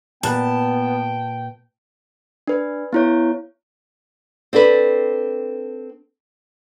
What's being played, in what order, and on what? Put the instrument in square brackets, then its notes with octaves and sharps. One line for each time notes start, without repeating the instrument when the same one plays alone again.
[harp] A#2 B4 F#6 [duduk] B3 [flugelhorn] G5 [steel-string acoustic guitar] A5
[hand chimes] D4 B4
B3 E4 C#5
[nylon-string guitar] C4 D4 A4 B4